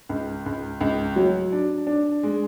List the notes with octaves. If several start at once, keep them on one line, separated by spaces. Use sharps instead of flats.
C#2
C#2
C#2
F#3
D4
D4
G#3